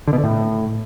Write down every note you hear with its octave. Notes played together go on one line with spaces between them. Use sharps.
D3
B2
D3
A2